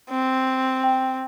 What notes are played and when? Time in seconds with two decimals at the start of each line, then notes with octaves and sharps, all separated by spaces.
0.10 C4
0.83 G5